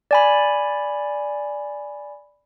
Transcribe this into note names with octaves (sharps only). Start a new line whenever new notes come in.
D5 G#5 B5